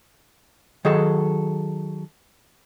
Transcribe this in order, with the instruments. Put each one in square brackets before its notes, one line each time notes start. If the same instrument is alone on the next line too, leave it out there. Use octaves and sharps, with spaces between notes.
[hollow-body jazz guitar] D#3 F#3 G#4 A4